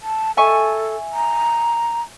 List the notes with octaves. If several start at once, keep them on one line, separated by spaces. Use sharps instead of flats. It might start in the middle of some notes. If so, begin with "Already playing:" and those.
A5
A4 E5 G#5 C#6
A#5